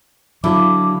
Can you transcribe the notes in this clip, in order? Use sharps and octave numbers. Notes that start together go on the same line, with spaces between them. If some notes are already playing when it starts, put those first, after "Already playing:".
D3 F#3 E4 F5 D6